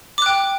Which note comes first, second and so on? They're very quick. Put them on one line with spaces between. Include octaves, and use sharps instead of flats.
D6 F#6 G5